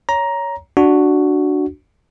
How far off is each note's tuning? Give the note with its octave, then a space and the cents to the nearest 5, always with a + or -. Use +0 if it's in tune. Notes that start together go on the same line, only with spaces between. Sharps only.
C#5 +15 A#5 +10
D4 +0 F#4 +0